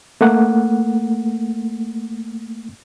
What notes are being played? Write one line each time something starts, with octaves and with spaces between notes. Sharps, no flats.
A3 A#3 F#5